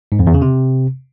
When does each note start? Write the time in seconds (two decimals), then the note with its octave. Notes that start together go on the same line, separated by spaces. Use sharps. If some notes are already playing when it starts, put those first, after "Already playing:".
0.12 G#2
0.19 F2
0.27 E2
0.34 C#3
0.42 C3